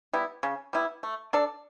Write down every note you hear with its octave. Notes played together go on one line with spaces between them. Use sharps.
G3 B3 E4
C#3
G3 B3 E4
A3
D4 A4 D5